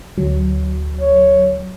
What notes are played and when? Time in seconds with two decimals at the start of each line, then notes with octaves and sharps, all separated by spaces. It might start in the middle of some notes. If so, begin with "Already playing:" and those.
0.17 D2 F#3
1.00 C#5